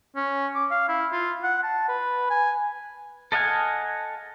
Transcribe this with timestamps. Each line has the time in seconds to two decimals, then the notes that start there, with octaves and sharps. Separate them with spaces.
0.16 C#4
0.55 D6
0.71 F5
0.89 E4
1.12 F4
1.43 F#5
1.63 A5
1.88 B4
2.30 G#5
3.32 A4 D#5 F5 F#5 G#5